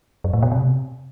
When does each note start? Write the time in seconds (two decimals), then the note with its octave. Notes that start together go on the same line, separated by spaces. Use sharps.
0.24 F#2
0.33 A2
0.43 B2
0.52 C3